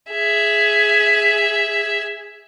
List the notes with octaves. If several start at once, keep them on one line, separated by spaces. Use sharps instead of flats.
G#4 E5